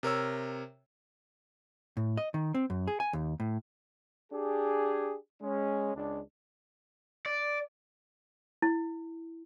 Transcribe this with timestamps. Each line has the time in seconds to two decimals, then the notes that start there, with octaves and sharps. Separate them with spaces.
0.03 C3 A#4 C#5 E6
1.97 A2
2.17 D#5
2.34 D#3
2.55 C4
2.70 F#2
2.87 G#4
3.00 G#5
3.13 D#2
3.40 A2
4.32 D4 G4 G#4
5.41 G#3 C#4
5.95 C#2 D4
7.26 D5
8.62 E4